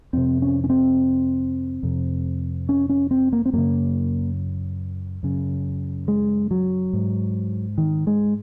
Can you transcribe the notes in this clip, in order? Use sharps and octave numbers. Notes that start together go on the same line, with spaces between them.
F2 C3 C4
C#4
C#4
C4
F2 C3
C#4
C#4
C4
A#3
C4
F#2 C#3 A#3
F#2 C#3
G#3
F#3
G#2
D#3
G#3